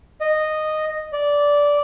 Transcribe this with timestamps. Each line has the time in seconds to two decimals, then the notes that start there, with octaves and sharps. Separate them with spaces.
0.21 D#5
1.13 D5